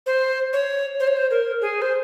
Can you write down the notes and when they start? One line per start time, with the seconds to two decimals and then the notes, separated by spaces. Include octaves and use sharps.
0.06 C5
0.53 C#5
1.00 C5
1.07 C#5
1.16 C5
1.30 A#4
1.61 G#4
1.82 C5